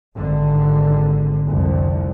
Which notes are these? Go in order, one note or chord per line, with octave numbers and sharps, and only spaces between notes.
G#1 D3
F1 C2 D3